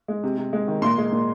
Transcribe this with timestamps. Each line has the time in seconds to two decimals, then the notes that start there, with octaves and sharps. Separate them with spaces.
0.08 G#3
0.24 C3
0.38 C3
0.53 G#3
0.68 D#3
0.82 A#2 C6
0.98 G#3
1.12 A#2